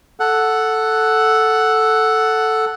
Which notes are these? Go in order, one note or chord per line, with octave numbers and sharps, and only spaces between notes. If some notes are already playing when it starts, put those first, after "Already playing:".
A4 F#5